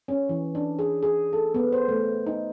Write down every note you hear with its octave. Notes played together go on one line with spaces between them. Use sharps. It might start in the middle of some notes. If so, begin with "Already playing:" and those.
C#4
E3
D4
G#4
G#4
A4
B3
C5
A3
D#4